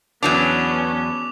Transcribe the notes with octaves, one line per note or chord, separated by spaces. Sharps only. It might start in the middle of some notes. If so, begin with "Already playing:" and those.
E2 F#3 B3 C#4 D4 D6 F7